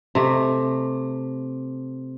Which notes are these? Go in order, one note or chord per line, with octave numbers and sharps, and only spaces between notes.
C3 A3